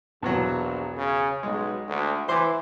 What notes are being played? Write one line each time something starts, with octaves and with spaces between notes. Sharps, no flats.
A#1 E2 B2 F#3
C#3
B1 G#3
D2
E3 C5 C6 D6